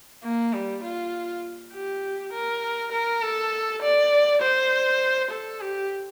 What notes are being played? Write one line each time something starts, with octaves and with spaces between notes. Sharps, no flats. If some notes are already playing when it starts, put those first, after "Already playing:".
A#3
G3
F4
G4
A#4
A#4
A4
D5
C5
A4
G4